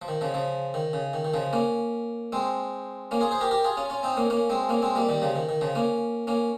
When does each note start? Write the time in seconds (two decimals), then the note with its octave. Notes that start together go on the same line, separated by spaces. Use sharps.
0.02 F3
0.08 D#3
0.21 C#3 F3
0.34 C#3 F3
0.74 D#3
0.93 C#3
1.13 D#3
1.25 D#3
1.34 C#3 F3
1.53 A#3 C#4
2.32 G#3 C4
3.11 A#3 C#4
3.21 F4 G#4
3.31 G#4 C5
3.41 G4 A#4
3.51 G4 A#4
3.64 F4 G#4
3.77 C#4 F4
3.90 C#4 F4
4.03 C4 D#4
4.17 A#3 C#4
4.30 A#3 C#4
4.50 G#3 C4
4.69 A#3 C#4
4.82 G#3 C4
4.95 G3 A#3
5.09 D#3 G3
5.22 C#3 F3
5.35 D#3
5.49 D#3
5.61 C#3 F3
5.75 A#3 C#4
6.27 A#3 C#4